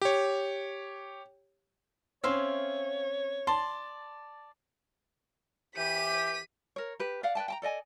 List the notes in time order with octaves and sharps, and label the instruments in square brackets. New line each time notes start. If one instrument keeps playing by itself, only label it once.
[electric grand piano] G4 C#5
[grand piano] C4 C#4 [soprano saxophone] C#5 [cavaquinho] E5 F5 C6
[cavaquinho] D5 C6 [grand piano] A5
[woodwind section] E3 G4 [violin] B6 D#7
[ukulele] A#4 C#5
G4 B4
D5 F5 F#5
B4 D5 G5 A5
G5 A5 A#5
A4 D5 D#5 G#5